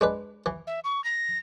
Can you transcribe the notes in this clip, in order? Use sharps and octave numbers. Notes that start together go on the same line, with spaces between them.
G#3 D4 B4
E3
E5
C#6
A#6